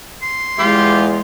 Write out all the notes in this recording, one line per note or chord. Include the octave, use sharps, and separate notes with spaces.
C6
E2 G#3 F4 G4